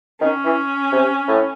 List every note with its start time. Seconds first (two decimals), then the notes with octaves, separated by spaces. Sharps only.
0.21 D#3 C#4
0.45 E3
0.92 C3
1.28 A2